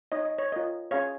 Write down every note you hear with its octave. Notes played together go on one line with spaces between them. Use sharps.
D#4 C#5 D#5
D#5
C#5
F4 A#4 C#5 D#5
C#4 G#4 C#5 F5